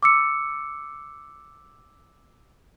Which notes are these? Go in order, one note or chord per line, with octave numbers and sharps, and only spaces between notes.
D6 E6 C#7